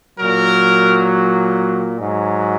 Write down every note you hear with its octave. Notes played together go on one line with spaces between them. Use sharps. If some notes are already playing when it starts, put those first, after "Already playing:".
A#2 F#3 A#4
G#2 F#3